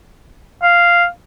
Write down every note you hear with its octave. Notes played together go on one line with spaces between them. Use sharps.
F5